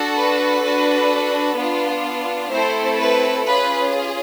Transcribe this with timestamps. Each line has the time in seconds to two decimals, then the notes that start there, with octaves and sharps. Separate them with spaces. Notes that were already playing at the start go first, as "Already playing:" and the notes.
Already playing: D4 F#4 A4
0.16 B4
0.63 D4 F#4 A4
1.58 B3 D4 F4
2.52 A3 C4 E4 A4 C5
3.00 B4
3.47 C#4 F4 G#4 B4